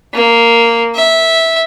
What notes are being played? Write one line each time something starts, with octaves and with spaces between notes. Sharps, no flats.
A#3
E5